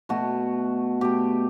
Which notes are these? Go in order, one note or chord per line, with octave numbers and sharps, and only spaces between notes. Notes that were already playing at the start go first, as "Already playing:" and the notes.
B2 A3 F#4
B2 A3 G4